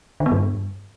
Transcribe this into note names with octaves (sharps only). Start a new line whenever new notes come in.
D3
B3
G2